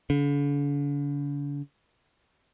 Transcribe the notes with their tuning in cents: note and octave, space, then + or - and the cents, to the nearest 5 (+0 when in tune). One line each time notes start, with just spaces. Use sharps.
D3 -45